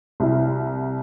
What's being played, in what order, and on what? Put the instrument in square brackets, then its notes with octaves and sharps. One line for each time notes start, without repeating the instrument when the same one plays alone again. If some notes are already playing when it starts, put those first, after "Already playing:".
[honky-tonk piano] C2 E4